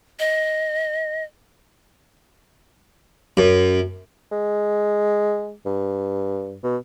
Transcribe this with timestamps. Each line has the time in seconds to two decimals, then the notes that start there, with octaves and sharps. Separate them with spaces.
0.19 D#5
3.37 F#2
4.31 G#3
5.65 G2
6.63 B2